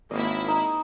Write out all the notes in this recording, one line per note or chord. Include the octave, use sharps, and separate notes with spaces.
G#1 A#3 E4 D#5
D#4